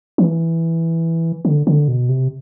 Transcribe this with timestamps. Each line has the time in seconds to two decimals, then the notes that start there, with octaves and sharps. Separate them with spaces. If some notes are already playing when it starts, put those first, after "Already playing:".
0.18 E3
1.45 D3
1.67 D3
1.88 B2
2.09 C3